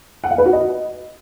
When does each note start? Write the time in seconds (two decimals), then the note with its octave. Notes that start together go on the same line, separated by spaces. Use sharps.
0.24 F#5
0.31 F5
0.38 B4
0.46 F#4
0.53 D#5